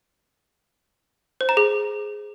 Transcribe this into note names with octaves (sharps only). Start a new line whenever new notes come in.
C5
A#5
G#4